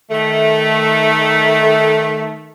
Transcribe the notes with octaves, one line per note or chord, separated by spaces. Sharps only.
D#3 A3